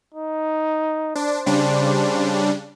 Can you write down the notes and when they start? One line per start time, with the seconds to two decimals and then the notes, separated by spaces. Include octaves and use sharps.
0.15 D#4
1.16 D4 C5
1.46 C#3 G3 D4